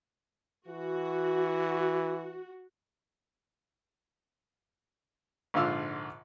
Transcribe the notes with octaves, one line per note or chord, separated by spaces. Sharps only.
E3 F#4
A#1 G#2 D3 F4 F5 E6